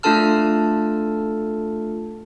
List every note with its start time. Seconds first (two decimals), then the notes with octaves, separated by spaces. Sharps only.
0.03 A3 D4 F4 A4 A5 F6